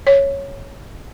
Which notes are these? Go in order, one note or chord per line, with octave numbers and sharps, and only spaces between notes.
C#5